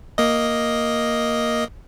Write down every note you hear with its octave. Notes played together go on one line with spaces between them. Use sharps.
A#3 D#5